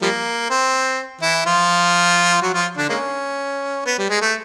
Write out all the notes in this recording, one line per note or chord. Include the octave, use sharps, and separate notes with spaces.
F3 G3 A#3
C4
E3 E4
F3 F4
F#3 F#4
F3 F4
D3 D4
G#3 A#3 C#4
B3
G3
G#3
A3